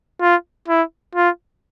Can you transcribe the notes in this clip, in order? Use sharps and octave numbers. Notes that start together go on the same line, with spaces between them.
F4
E4
F4